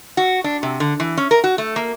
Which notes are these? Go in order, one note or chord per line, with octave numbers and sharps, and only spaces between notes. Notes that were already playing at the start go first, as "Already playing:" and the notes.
F#4
D4
C3
D3
E3
C#4
A#4
F#4
A3
A#3